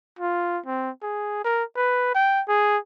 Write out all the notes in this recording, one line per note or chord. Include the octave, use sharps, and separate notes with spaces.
F4
C4
G#4
A#4
B4
G5
G#4